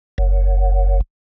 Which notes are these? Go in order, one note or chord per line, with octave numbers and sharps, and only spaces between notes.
F#1